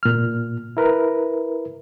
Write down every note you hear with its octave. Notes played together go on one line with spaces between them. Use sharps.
A#2 F6
E4 A#4 B4